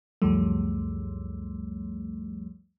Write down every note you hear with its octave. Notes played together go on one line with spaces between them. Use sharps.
C#2 F#2 F3 G3 A3